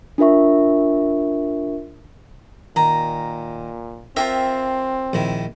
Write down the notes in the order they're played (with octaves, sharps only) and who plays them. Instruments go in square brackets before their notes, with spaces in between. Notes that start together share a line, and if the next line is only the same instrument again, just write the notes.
[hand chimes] D4 F4 A#4 E5 C#6
[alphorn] A#2 [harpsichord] D#3 [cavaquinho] A#5
[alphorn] C4 [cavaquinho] F4 F#4 E5 [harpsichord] A#4 G5
[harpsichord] A#1 D#3 E4